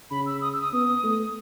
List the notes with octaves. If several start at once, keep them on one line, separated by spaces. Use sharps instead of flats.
C#3 B5
E6
D#6
E6
D#6
B3 D#6
A3